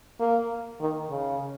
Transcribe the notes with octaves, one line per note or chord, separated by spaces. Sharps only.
A#3
D#3
C#3